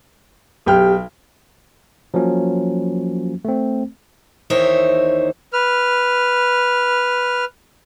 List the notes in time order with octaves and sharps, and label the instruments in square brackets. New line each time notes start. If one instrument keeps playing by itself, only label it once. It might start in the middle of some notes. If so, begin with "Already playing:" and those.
[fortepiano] B1 G5 F6 [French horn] G4
[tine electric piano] F3 F#3 A#3 C#4
A3 C4
[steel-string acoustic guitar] D#2 E3 D#4 C5 C#5 E5
[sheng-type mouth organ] B4 F6